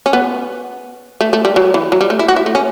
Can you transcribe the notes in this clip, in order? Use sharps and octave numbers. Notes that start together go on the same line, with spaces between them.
C#4
B3
A3
A3
G3
F#3
E3
F#3
G3
A3
E4
F#4
E4
A3
C#4